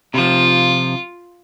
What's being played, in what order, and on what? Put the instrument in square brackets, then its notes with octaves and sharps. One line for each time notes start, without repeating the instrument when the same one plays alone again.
[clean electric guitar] C3 F3 [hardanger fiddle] F4